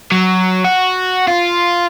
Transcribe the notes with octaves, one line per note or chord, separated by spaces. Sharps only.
F#3
F#4
F4